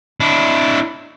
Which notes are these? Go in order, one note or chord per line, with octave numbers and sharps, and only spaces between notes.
D4 E4